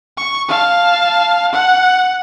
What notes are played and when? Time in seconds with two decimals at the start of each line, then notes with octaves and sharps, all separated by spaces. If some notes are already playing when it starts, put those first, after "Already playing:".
0.17 C#6
0.48 F5 A5
1.52 F#5